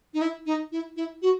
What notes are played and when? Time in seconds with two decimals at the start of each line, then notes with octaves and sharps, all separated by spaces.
0.14 D#4
0.21 E4
0.46 D#4
0.72 E4
0.96 E4
1.22 F#4